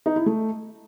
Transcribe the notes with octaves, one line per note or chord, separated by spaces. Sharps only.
D#4
E4
A3